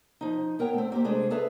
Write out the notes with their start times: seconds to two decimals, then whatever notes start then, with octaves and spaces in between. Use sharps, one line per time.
0.21 F3 D#4
0.59 B3 A#4 C#5 G5
0.74 A3 C4
0.92 A#3 G4 C5
1.04 C3 G#3 A3 D4 G#4 C5
1.30 G#4 A4 B4 C#5 E5 A5